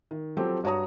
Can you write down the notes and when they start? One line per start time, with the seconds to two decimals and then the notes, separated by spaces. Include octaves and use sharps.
0.11 D#3
0.37 F3 F#3 C4 G4 A4
0.63 G2 F#4 C#5 A#5 D#6